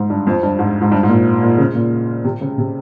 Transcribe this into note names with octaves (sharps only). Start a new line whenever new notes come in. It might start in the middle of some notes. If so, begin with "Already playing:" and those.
Already playing: G#2
G2
F2
G2
G#2
G#2
G2
G#2
A#2
A#2
C#3
A#2
C3
C#3
C3